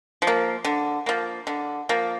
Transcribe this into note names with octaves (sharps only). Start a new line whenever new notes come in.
F3
A#3
D3
F3 A#3
D3
F3 A#3